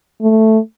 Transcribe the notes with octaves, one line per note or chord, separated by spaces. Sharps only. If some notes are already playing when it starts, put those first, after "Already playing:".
A3